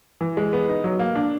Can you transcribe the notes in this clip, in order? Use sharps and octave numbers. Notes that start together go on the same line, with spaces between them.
E3
G#3
B3
D#4
F#3
A#3
D4